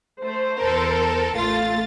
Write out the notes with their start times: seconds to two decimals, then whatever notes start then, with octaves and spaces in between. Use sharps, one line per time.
0.22 A3 C5
0.57 E2 A4 A#4
1.35 A1 A3 F4 A6